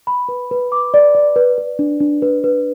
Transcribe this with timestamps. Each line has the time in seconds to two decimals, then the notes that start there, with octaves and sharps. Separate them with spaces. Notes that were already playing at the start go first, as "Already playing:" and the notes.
0.07 B5
0.29 B4
0.51 B4
0.72 D6
0.94 D5
1.15 D5
1.36 B4
1.58 B4
1.79 D4
2.00 D4
2.22 B4
2.44 B4